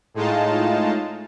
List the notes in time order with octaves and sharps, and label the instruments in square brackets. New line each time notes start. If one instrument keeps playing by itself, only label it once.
[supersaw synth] A2 G#3 D#4 F4 A5